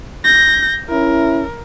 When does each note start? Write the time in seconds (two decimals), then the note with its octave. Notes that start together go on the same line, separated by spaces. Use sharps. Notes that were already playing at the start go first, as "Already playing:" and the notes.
0.25 G6 A#6
0.89 C#4 E4 A#4